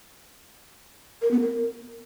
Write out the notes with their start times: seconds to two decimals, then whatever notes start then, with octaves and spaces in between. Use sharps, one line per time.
1.22 A#4
1.31 B3
1.40 A#4